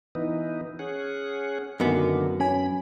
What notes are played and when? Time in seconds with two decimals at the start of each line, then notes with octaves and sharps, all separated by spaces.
0.15 E3 B3 D#4
0.79 C#4 G#4 F#5
1.80 F#2 D3 D#3 A#3 B3
2.40 C#4 G#5 B5